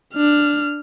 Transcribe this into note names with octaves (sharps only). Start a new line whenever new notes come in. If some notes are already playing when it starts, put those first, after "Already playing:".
D4 F6